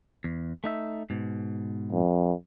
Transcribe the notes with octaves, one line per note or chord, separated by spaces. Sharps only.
E2
A3 D#4 E5
G#2 B2
F2